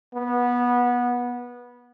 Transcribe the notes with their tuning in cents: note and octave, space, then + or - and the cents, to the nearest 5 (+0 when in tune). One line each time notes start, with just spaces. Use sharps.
B3 -20